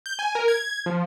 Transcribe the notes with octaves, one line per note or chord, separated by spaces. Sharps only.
G6
G#5
A#4
G#6
F3